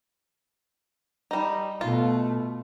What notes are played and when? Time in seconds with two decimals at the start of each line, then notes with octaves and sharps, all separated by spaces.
1.31 G3 D#4
1.81 B2 A3 F4